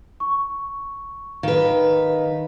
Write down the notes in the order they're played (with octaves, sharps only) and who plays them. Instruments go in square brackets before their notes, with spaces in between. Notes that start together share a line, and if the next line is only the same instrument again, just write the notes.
[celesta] C#6
[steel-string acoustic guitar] D#3 B4 [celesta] F5